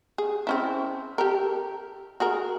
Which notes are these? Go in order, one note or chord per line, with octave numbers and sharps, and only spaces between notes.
G#4
C4 C#4 E4
G4 A4 A#4
F#4 G#4 A#4